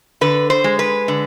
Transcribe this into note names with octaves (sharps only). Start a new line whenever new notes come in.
D3 B4
C5
G#3
B4
D3